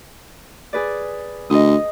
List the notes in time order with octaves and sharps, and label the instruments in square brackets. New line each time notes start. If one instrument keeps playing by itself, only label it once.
[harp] G#4 B4 D5
[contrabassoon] D2 [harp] D#5 D#6